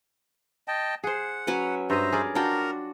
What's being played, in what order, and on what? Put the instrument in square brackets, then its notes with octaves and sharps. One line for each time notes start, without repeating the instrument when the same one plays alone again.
[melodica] D#5 G5 A5
[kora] G#4 C5 [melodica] F#5
[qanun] F#3 C#4 B4
[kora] G2 D#5 [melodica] C5 E5 A#5
[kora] G#4 A#4 D5
[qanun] D4 F#4 [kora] F4 G5 [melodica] A#4 A#5